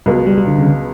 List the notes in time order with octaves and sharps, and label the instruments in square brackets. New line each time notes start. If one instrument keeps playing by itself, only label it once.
[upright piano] C#2 B2 F#3 B3 [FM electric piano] G3
[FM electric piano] G3
G3
D3
C#3